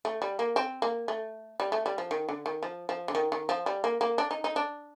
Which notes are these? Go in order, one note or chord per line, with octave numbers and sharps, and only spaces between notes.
A3
G3
A#3
C4
A#3
A3
G3
A3
G3
F3
D#3
D3
D#3
F3
F3
D3
D#3
D#3
F3
G3
A#3
A#3
D4
D#4
D#4
D4